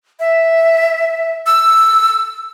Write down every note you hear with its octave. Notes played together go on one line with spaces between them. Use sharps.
E5
E6